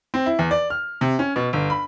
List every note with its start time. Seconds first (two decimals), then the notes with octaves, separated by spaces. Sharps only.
0.14 C4
0.26 E4
0.39 E2
0.51 D5
0.70 F6
1.01 C3
1.19 C#4
1.36 B2
1.53 G1
1.70 B5